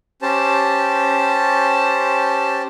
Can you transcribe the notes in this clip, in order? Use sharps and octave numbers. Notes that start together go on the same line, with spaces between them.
C#4 G4 C5 A5